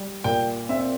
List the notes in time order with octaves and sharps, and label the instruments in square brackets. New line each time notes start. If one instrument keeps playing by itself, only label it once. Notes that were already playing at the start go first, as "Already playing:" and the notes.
Already playing: [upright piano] G3
[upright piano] A#2 [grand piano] G5
[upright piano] C4 [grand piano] E5